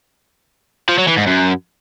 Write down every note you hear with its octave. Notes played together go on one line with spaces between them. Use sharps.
F3
F#3
E3
G#2
F#2